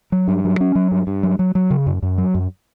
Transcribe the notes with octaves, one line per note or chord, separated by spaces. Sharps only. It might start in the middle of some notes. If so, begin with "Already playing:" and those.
F#3
G2
F#3
C#4
F#3
G2
G2
F#3
F#3
F#3
C#3
F#2
F#2
F#3
F#2